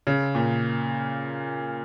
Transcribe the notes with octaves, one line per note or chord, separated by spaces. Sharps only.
C#3
A#2